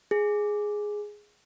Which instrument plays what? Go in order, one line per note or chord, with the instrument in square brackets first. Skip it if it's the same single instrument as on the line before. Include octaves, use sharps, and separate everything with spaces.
[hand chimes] G#4